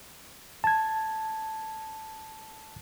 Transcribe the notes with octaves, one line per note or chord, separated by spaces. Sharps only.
A5 G#6